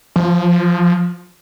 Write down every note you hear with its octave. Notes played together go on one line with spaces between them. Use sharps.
F3